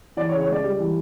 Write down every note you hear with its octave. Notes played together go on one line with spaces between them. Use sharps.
E3 D5
C#5
C#3
C#5
C#2 D5
G3
E3